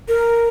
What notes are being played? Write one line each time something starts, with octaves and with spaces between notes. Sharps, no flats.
A#4